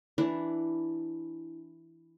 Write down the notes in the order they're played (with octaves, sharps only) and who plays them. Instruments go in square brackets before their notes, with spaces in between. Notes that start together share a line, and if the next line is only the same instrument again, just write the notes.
[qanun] E3 D4 E4